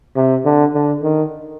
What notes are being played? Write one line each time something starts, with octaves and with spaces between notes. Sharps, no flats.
C3
D3
D3
D#3